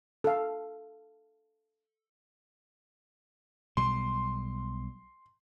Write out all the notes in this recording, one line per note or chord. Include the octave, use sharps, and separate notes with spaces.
A4 F5
B1 G3 C6